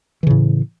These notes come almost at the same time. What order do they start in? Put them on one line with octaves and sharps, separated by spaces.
E3 C#3 A2